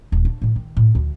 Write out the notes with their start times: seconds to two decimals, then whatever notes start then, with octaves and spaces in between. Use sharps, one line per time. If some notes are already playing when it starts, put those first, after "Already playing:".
0.12 D#1
0.25 D4
0.42 A2 D3
0.56 D#3
0.77 A2
0.95 D2 G#3